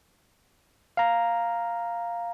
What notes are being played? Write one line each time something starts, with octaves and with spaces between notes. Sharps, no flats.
F5 A#5